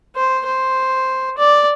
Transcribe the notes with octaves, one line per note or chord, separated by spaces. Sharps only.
C5
C5
D5